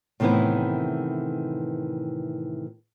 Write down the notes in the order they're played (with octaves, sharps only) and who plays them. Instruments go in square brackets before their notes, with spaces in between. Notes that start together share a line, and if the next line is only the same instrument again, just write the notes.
[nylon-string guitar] A2 C3 D#3 E3 B3 E4